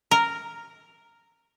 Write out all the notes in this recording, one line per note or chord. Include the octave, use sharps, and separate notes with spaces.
A#4